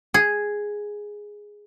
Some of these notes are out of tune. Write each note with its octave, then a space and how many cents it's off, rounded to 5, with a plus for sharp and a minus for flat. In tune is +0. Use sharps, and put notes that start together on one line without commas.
G#4 +0